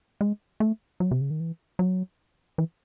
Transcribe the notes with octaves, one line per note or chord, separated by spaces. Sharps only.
G#3
A3
F#3
C3
C#3
D#3
E3
F#3
E3